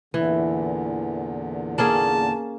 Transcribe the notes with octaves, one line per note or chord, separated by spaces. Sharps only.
E2 A#2 D3 E3
A#3 C#4 G#4 A5